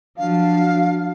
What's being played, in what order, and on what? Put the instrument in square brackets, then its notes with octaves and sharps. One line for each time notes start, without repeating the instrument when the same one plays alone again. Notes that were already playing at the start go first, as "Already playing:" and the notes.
[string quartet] F3 F#3 D4 [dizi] F5